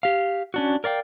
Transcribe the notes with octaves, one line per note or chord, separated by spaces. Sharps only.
G4 F5
C#4 D4 F#4
A#4 D5 F5 G5